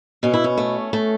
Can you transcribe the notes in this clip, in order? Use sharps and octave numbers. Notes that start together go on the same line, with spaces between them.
B2 C#4
E4
C#4
A3
A3